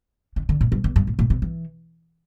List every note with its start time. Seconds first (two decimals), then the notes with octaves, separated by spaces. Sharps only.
0.36 D3
0.49 D3
0.61 A2
0.72 G2
0.84 E2
0.96 G2
1.07 A2
1.19 A2
1.30 C3
1.42 E3